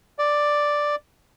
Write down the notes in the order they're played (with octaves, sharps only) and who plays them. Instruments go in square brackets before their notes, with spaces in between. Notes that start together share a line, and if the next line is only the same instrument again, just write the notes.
[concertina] D5